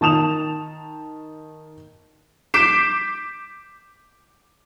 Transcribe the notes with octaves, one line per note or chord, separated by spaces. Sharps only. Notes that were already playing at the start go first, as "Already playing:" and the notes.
D#3 A5 D#6 E7 F7
D6 G6 B6 C7 D7 E7